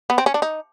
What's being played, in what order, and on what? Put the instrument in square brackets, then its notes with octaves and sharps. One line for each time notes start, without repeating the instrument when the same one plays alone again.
[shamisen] B3
C4
C#4
D4
D#4